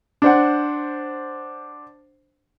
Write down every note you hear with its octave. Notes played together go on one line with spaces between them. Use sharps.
D4 C5 F#5